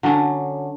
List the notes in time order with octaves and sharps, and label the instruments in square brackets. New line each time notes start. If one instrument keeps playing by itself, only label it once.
[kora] D3 F#3 C#4